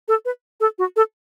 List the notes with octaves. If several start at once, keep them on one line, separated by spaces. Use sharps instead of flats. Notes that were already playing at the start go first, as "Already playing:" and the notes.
A4
B4
A4
F#4
A4